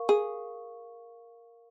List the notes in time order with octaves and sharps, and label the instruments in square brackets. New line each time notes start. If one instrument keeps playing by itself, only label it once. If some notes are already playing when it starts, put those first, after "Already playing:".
Already playing: [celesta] A#4 F5 C#6
[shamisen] G#4